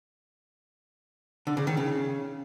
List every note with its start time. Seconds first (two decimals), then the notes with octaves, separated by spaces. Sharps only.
1.47 D3
1.57 C#3
1.67 D#3
1.77 C#3